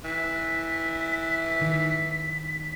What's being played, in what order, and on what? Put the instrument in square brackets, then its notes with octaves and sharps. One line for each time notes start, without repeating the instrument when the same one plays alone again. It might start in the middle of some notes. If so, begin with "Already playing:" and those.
[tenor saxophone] E3 [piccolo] B6
[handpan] D#3